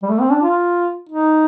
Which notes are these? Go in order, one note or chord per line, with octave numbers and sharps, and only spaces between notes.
G3
A3
C4
D4
F4
D#4